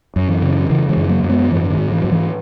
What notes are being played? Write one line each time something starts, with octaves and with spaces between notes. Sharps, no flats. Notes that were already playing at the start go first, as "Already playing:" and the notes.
F#2
E3
C#3
C#3 E3
E3 G#3
F#2
F#3 A#3
F#2
G#3 B3
G#2 E3
D#3
G#2
E3
G#2 F#3
E3